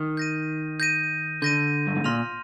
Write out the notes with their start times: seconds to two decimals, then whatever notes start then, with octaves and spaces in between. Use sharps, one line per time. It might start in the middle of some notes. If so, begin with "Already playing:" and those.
Already playing: D#3
0.17 G6 A#6 D#7
0.80 G6 A#6 D#7
1.42 D3 G6 A#6 D#7
1.87 G2
1.96 G#2
2.04 A#2 C6 F6 A#6 F7